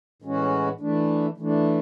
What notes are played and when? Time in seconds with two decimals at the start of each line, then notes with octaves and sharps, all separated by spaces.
0.22 A2 E3 G#3 C#4 F#4
0.80 E3 A3 D4
1.38 E3 A3 D4